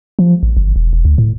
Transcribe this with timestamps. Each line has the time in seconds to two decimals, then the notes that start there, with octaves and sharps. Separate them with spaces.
0.19 F3
0.43 A1
0.57 G1
0.76 E1
0.93 E1
1.05 D2
1.18 A2